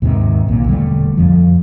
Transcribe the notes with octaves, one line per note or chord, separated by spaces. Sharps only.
D#2 G#2 C3 D#3
B1 A#2
E1 D3 G3 A3
F2 F3